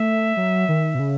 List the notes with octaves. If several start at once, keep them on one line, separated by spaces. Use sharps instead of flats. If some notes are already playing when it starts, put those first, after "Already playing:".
Already playing: A3 E5
F#3
D#3
B2
C#3